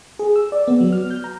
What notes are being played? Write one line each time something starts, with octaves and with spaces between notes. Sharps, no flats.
G#4
E6
D5
B3
F#3
F6
G6
A#5